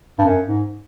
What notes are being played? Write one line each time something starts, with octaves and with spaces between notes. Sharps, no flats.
G2
F#2
G#2